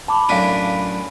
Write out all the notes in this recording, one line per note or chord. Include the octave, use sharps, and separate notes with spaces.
A5 B5 D6
F#2 A2 D4 F5 B6 D#7